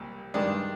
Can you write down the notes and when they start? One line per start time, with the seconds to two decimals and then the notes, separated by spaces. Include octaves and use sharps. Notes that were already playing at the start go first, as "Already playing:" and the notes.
Already playing: C2 A#2
0.34 G2 D#3 G#3 D4